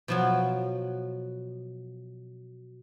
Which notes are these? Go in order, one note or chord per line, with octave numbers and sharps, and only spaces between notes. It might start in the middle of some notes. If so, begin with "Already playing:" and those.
B2 F3 F#3